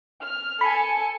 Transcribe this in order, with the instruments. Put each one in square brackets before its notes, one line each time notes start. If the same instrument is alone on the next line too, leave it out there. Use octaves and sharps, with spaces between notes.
[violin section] F6
[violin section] A4 G#5 C#7 [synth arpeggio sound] B5